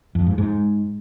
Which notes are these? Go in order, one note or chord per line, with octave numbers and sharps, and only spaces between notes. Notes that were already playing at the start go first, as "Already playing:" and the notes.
F2
G#2
G#2